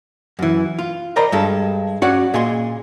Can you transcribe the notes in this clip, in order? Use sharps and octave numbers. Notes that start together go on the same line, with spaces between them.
F#2 E3
F4
A#4 C5 D5 D#5 A#5 B5
G2 G#3 A4
C#4 F#4 D5 F#5
A#2 G#4 D#5 C6